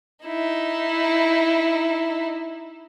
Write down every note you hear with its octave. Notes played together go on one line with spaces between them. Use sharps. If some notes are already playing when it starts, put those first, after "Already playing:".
D#4 E4